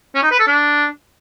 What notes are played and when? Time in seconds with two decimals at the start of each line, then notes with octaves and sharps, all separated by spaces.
0.15 C#4
0.23 D#4
0.31 B4
0.39 A4
0.47 D4